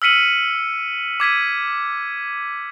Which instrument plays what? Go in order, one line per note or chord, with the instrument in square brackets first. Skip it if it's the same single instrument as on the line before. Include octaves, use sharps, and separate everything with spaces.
[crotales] E6 F6 B6 C#7 D#7 F#7
D6 G#6 B6 D#7